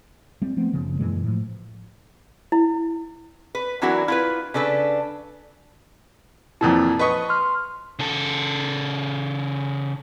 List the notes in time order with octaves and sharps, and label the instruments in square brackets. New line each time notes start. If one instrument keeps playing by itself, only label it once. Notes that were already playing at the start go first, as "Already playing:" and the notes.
[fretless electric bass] G3 C4
F3 A3 B3 C4
F#1 C#3 F3
F#2 A#2 E3 G#3
A2 F3
[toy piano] E4
[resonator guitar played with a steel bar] B4
E3 F#3 D4 E4 F#4 A#4
E4 F4 B4
C#3 D4 A4 B4
[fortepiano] F2 A#2 E3 [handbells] A5
[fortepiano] B4 D#5 C#6
[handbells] C6 F6
[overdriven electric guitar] C#3 A4